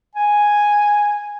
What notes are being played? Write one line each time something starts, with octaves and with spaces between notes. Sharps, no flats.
G#5